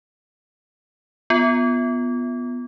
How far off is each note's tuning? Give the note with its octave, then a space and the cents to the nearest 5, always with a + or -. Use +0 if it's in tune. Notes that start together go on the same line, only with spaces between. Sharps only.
B3 +0 F4 +0